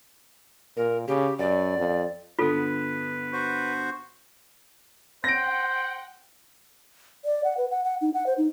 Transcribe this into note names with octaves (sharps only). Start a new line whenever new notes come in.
A#2 A#4
C#3 G4
F#2 D5
F2
G2 D3 B3 F4 A4 B4
F#4 C5
C5 F#5 G5 A#6 D7
D5
F#5
B4
F#5
F#5
D#4
F#5
C5
D#4